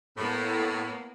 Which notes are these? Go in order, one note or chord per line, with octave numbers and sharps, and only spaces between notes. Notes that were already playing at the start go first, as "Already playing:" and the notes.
A2 A#3 B3